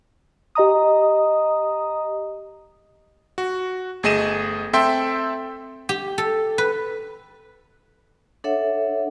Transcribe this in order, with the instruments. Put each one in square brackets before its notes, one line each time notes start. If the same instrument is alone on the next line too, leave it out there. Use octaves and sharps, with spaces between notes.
[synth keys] G4 D#5 A#5 D#6
[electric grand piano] F#4
G1 A3 G#4 D#5 D#7 E7
C4 A4 E5 G5 C6
[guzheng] G4
A4
B4
[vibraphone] D4 A4 C#5 E5 F#5